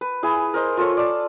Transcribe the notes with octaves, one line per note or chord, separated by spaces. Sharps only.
B4
E4 G#4
A#4 C5 D#5
F4 A4 C#5
D5 A5